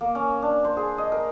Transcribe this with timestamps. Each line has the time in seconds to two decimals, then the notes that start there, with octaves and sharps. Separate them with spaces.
0.01 A#3
0.15 C#4
0.42 D4
0.65 C5
0.77 G#4
0.98 D#5
1.12 A#4